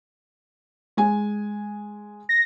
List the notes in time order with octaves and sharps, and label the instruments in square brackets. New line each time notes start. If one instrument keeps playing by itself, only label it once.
[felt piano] G#3 G#5
[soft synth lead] A#6